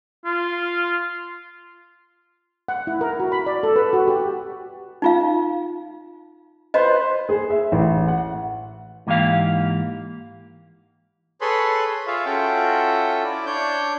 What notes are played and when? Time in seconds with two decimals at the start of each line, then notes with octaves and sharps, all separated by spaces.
0.25 F4
2.68 F#5
2.87 E4
3.01 A#4
3.20 F#4
3.32 B5
3.46 D5
3.63 A4
3.76 B4
3.93 F#4
4.08 G4
5.02 D#4 F4 F5
6.74 B4 C5 D#5
7.29 G#4
7.50 E5
7.72 A1
8.08 F#5
9.07 G#2 E3 A#3 G4 F5
11.41 G#4 A4 B4 C#5 B5 C6
12.07 F4 G#4 C#5 E5 F5
12.26 C#4 F4 F#4 A4 E5 G5
13.24 E4 D5
13.46 D4 C#5 G6